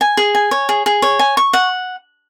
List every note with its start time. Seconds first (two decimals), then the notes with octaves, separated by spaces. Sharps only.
0.01 G#5
0.17 G#4
0.35 G#5
0.51 C#5
0.69 G#4
0.86 G#4
1.02 C#5
1.19 G#5
1.37 C#6
1.53 F#5